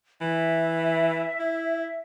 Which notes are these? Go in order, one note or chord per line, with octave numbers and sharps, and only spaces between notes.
E3 E5
E4